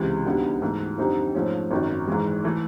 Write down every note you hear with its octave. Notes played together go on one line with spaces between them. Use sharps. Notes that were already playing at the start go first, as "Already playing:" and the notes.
Already playing: C#2 C3 E3 G#3
D2 D3 G3 B3 D#4
G#2 E3 A3
F2 D3 G3 C4 D#4
G#2 F3 A3 C#4
G#1 F#2 D#3
G#2 E3 G#3
E3 A3